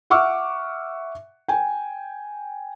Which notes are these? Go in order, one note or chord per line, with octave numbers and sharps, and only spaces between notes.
E5 F#5 C#6 D6 E6 F6
G5 G#5